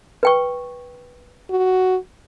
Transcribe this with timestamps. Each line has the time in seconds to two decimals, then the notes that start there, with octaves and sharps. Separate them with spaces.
0.23 B4 G5 C#6
1.50 F#4